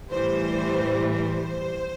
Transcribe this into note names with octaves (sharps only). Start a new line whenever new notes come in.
A2 E3 G3 C5
C5